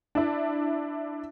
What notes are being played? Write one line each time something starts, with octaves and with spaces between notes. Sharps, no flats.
D4 E4